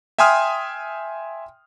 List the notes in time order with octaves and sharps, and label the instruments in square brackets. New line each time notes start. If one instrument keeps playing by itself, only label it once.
[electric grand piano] E5 G5 G#5 C6 D#6 F6